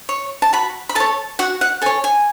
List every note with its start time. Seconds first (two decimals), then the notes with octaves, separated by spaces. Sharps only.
0.09 C#5
0.42 A5
0.53 F#4 B5
0.89 B5
0.95 A4 C#5 A5
1.39 F#4 F#5
1.61 F#5
1.82 A4 G#5
1.86 C#5
2.04 G#5